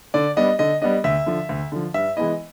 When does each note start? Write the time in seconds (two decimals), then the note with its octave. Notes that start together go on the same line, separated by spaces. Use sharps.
0.14 D3 D5
0.37 G3 B3 D4 D#5
0.59 D3 D#5
0.82 G3 B3 D4 D#5
1.04 D2 E5
1.26 D3 F3
1.49 D2
1.72 D3 F3
1.94 G2 E5
2.16 E3 G#3 B3 E4 D#5